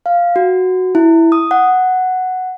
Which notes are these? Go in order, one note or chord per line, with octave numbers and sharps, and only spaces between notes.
F5
F#4
E4
D#6
F#5